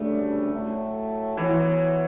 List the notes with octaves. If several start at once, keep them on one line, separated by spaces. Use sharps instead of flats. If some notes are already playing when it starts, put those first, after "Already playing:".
Already playing: D2 C#3 G3 A3 D4
A2 F#3 A3
E3 F#3 B3 F#4 C#5